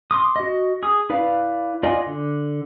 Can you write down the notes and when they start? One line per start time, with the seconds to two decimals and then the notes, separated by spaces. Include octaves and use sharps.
0.11 C6 D6 D#6
0.36 F#4 D#5
0.83 G#4 D#6
1.10 E4 B4 D5 F5
1.83 F4 D5 D#5 F#5 G#5
2.06 D3